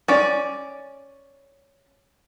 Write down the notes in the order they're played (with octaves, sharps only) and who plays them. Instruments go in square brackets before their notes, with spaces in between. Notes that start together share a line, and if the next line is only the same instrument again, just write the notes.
[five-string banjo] C#4 D5